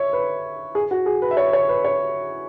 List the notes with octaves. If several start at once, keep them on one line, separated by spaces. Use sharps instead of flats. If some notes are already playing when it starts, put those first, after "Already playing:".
Already playing: C#5 E5
B4
G#4
F#4
G#4
B4
E5
C#5
C#5
B4
C#5